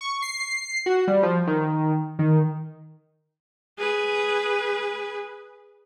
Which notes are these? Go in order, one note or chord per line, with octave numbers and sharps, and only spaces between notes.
C#6
C7
F#4
G3
F3
D#3
D#3
G#4 B4